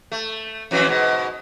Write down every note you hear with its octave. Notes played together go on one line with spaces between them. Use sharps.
A3
F2 E3 F#3
G#2 B2